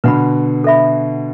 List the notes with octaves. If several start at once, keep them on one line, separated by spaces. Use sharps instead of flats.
B2 D3 B4 F#5 B5
A4 E5 B5